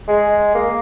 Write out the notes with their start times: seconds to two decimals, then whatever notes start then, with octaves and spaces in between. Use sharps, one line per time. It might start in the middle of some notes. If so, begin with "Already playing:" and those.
0.08 G#3
0.55 A#3